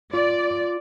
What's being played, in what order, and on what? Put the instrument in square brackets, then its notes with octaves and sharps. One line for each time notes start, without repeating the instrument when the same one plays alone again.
[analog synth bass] F4 [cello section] D5